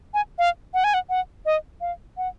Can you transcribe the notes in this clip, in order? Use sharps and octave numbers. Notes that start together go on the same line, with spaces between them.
G#5
F5
F#5
G#5
F#5
F#5
D#5
F5
F#5